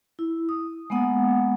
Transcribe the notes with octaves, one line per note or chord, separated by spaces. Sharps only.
E4
D#6
G#3 A#3 B3 F#5 D#6